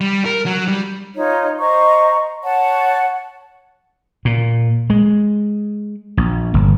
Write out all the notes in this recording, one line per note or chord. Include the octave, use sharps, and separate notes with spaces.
G3
A#4
F#3
G3
D#4 F4 C#5
C5 D#5 A#5 C#6
C#5 F#5 A5
A#2
G#3
A#1
G1